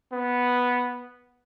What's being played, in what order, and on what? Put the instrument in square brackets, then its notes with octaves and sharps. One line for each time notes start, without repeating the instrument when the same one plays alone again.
[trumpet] B3